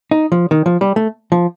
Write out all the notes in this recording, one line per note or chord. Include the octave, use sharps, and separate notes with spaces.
D#4
F3
D#3
F3
G3
A3
F3